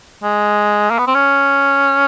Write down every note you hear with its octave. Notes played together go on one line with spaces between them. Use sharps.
G#3
A#3
B3
C4
C#4